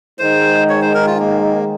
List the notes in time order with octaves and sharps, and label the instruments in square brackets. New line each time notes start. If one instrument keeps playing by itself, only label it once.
[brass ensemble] G#2 D#3 G#3 [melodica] C5
[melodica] C#5
C5
A#4
F4
A#3